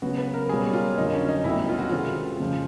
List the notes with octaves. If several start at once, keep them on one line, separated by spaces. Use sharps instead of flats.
C#3 F#3 B3 F#4
B4
A#4
B2 G3 A#3 C#4 G#4
F4
F2 D3 F#3 A#3 D#4
C#4
D#4
C2 B2 F#3 A3 E4
F4
F#4
F#2 D#3 G#3 C4 F4
F2 C#3 F3